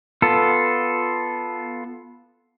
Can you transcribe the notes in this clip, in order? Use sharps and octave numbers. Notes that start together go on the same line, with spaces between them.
B3 F4 A4